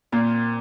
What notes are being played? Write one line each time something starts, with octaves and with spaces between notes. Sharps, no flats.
A#2 A#3 C4